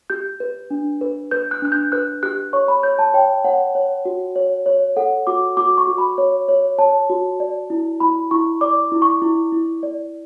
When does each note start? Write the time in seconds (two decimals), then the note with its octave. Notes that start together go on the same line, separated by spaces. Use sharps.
0.10 G4 G6
0.40 B4
0.70 D4
1.01 B4
1.31 B4 G6
1.51 F#6
1.62 D4 F#6
1.72 G6
1.92 B4 F#6
2.23 G4 F#6
2.53 C#5 C#6
2.68 B5
2.83 C#5 G6
2.99 A5
3.14 C#5 G5
3.45 C#5 F#5
3.75 C#5
4.05 F#4
4.36 C#5
4.66 C#5
4.97 A4 F#5
5.27 F#4 D6
5.57 F#4 D6
5.78 C#6
5.88 F#4
5.98 B5
6.18 C#5
6.48 C#5
6.78 C#5 A5
7.10 F#4
7.40 D5
7.70 E4
8.00 E4 B5
8.31 E4 C#6
8.61 D5 D6
8.92 E4
9.02 C#6
9.22 E4
9.52 E4
9.83 D5